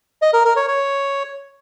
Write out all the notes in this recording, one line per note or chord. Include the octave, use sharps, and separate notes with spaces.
D#5
A#4
A#4
C#5
C#5